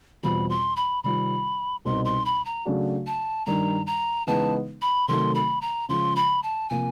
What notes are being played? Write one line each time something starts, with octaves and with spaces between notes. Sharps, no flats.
E2 B2 G3 C4 F4 B5
C6
B5
C3 D#3 G3 C4 F4 B5
C2 B2 G3 C4 D#4 C6
C6
B5
A#5
C#3 F#3 A3 D4 F#4
A5
G2 D#3 G3 A#5
A#5
C#3 E3 G#3 B3 D#4 A5
B5
C3 D#3 F#3 A3 C6
B5
A#5
C#3 F3 G#3 C6
B5
A5
C3 F3 A#3 G#5